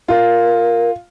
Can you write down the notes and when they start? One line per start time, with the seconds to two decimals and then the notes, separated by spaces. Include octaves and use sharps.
0.08 F4 A#4